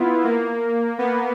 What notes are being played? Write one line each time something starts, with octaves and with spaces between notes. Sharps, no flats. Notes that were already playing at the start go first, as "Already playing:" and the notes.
Already playing: B3 E4 F4
A#3
B3